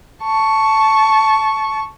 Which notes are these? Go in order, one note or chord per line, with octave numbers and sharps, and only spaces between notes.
A5 C#6